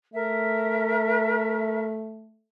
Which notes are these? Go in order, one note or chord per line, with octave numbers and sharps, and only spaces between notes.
A3 A#4 E5